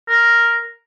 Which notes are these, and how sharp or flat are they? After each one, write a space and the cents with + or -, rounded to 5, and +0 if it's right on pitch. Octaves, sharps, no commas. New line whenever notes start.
A#4 +0